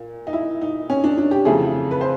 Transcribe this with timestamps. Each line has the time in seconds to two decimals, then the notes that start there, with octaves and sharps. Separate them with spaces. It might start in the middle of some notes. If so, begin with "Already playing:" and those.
Already playing: A#2
0.27 D#4
0.33 E4
0.61 D#4
0.90 C#4
1.04 D4
1.18 D4
1.31 G4
1.45 F2 C#3 E3 A3 G#4
1.91 B4
2.01 C5